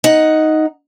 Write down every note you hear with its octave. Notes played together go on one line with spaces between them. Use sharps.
D#4 F#5